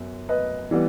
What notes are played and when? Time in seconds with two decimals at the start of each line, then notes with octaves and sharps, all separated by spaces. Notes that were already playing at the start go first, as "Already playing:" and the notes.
Already playing: F#2 B3
0.29 B4 D#5
0.71 E3 G3 B3